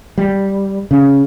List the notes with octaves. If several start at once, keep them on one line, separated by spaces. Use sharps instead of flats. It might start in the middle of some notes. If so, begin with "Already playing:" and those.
G3
C#3